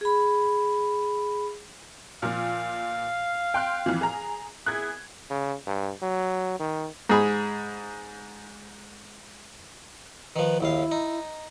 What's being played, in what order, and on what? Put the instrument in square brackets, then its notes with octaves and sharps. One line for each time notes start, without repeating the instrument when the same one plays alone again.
[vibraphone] G#4 B5
[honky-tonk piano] A#2 F3 [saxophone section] F5
[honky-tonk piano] G5 C6 F#6
F2 E3
G#4 A#5
[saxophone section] B3 E4 G#4 [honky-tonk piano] F#6 G#6
[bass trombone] C#3
G2
F#3
D#3
[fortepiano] G#2 G#4 B5
[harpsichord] D#3 F3 [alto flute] B4
[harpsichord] A#1 D#2 F5 [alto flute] E4
[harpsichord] D#4